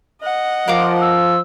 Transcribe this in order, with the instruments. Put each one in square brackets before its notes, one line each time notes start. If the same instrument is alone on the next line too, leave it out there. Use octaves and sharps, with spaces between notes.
[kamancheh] D#5 F#5
[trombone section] F3 [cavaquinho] A#4 F5 D6
[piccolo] E6